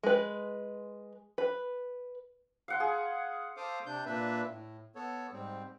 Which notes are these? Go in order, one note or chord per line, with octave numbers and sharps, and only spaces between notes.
G#3 B4
B4
F5 F#5 C6
G#4
A4 C5 F5 D6 D#6
C3 D4 G6
A#2 A#3 D4 B4 E5
A2
B3 A4 C#5
G#2 G3 C4